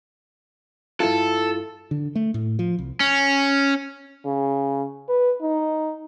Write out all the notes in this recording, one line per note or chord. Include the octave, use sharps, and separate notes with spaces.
G2 E4 F4 A4
D3
A3
A2
F3
C2
C#4
C#3
B4
D#4